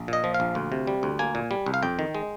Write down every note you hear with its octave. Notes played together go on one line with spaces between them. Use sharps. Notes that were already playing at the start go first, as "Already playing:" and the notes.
Already playing: A#1
A#2 D#5
F3
F5
A#1
D2
C3
G3
D2
A#3 G#5
A#2
G3
C2
F5
F2 G5
D#3
G#3